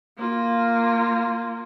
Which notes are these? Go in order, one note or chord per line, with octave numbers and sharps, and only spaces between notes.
A#3 F4